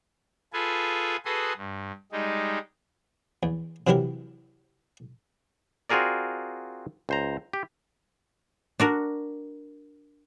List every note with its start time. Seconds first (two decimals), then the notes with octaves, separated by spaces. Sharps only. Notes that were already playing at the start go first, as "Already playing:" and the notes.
0.53 F4 G#4 A4 B4 G#5
1.25 F#4 G#4 A4 B4 C6 D#6
1.57 G2
2.12 G3 G#3 D#4
3.43 E2
3.87 C3 E3 F#3 E4 G4 A#4
5.90 C4 F4 F#4 G#4 A#4 D5
7.09 C#2 C5 A#5
7.53 G4
8.80 D4 F#4 A#4